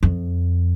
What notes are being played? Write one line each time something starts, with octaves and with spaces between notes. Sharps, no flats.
F2